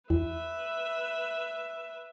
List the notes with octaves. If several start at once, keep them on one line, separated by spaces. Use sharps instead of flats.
E2 B4 E5